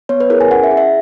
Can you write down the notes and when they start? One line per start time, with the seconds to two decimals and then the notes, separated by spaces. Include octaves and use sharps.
0.09 B3 C#5
0.20 B4
0.30 E4 G#4 A#4
0.41 G#5
0.50 C#4 F#5
0.64 E5
0.71 E4 G#4
0.77 E5